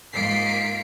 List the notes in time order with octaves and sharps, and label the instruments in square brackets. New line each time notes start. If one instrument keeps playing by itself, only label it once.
[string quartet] G#2 A#3 F4 [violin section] B6 C7 D7